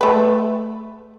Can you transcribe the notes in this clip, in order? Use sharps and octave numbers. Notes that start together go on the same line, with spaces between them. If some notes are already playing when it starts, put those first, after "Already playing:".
A3 B4